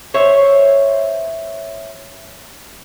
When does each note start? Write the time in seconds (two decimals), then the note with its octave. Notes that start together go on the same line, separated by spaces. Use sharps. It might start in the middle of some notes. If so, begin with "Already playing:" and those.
0.14 C5 C#5 E5